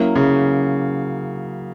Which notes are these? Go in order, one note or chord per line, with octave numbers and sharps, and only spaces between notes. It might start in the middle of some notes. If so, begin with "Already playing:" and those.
Already playing: F#3 A#3 C#4 E4 A#4
C#3